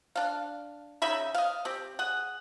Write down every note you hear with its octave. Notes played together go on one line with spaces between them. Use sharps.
D4 F5
C#3 D#4 E5 B5
D#5 F5
C4 G4
G#4 F#5